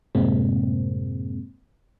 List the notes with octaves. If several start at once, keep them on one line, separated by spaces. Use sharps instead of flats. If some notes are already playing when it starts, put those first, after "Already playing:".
F#2 A2 C3 G#3 A#3 C4